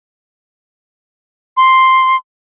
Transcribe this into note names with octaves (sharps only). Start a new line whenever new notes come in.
C6